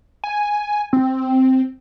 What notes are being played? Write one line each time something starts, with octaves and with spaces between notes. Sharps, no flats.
G#5
C4